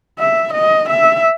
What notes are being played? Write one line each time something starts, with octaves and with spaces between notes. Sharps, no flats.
E5
D#5
E5